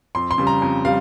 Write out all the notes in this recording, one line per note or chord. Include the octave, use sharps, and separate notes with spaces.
F2 C6
C6
C#3 G3
A#5
F2
G3 F5